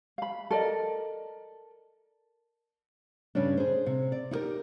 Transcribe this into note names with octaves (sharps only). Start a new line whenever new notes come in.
F5 B5
A4 A#4 D5 D#5
G2 C#3 G3 C#4 D4
G#4 C5
C3
D5
D#4 E4 G4 A#4